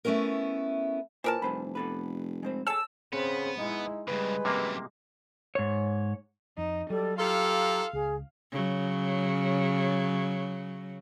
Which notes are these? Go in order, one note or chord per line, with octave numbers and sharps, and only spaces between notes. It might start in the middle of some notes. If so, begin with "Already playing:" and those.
A3 B3 C#4 E4 A#4
A#2 E3 A#4 C5 A5
F1 G2 C5 B5
B3 A4 B4
G#3 C4 C5
G#4 A4 C#5 A5 E6
C#3 B3 C4
G#3 D#4 E4
G2 C#3 G3 G#3 B4
F#2 C3 E3 A#3
G#2 C#5
F2 D#4
F#3 G3 A4
F4 G4 A4 F5 A#5
C#2 G#4
C#3 F#3